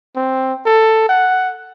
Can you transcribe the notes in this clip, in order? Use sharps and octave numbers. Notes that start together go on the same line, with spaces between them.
C4
A4
F#5